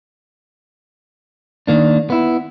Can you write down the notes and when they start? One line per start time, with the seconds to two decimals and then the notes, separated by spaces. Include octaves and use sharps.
1.67 D#3 A#3 D4
2.10 B3 E4